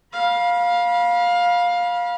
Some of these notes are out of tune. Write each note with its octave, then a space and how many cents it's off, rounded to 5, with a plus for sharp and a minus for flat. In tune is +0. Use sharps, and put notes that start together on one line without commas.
F5 +15 B5 -30